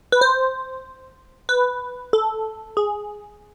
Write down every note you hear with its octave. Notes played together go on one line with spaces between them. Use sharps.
B4
C5
B4
A4
G#4